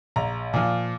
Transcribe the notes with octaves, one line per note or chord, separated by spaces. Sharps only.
A#1 A#5
A#2 F3